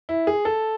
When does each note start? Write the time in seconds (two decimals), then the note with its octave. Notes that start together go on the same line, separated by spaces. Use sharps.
0.09 E4
0.27 G#4
0.45 A4